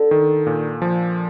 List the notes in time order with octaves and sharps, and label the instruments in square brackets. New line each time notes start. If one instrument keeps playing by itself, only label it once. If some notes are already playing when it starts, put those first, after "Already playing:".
Already playing: [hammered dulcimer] D3
[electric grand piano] D#3
A#2
F3